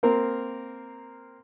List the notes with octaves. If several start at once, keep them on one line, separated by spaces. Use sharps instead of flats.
A#3 C4 A#4